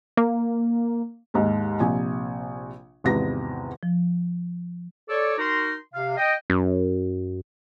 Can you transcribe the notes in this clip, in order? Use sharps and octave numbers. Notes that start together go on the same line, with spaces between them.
A#3
D#2 G#2
A#1 C3 G#5
G#1 E2 C3 B3 A#6
F3
A4 C#5 D5
D#4 F#4 A#4 A#5 C6
C3 F5
D#5 G5
F#2